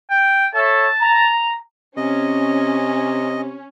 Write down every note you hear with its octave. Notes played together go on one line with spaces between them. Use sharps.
G5
A4 C#5 E5 A5
A#5
C3 C#4 D#5